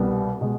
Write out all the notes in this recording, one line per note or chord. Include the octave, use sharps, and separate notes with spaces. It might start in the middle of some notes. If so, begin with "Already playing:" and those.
Already playing: C2 B2 G3 B3
B2 G#3